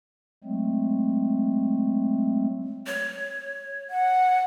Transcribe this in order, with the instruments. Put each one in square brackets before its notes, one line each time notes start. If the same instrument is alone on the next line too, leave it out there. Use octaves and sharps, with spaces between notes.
[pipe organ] F#3 G#3 A3 C4
[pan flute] C#5
[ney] F#5